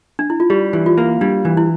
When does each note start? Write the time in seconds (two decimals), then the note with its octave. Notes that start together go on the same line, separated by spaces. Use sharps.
0.19 D4
0.30 E4
0.40 F4
0.50 G3 G4
0.73 E3
0.86 F4
0.98 A#3
1.21 G3 D4
1.45 E3
1.57 E4